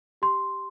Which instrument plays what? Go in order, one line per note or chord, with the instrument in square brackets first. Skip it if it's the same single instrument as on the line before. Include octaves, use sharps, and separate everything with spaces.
[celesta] G4 C6